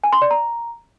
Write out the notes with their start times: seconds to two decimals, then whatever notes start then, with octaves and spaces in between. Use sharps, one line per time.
0.04 G#5
0.13 C6
0.22 D5
0.31 A#5